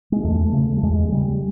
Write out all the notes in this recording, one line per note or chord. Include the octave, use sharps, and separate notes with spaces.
G#3
E2 A3
C#3 A3
G3
E2 G#3
G#3
C#3 G3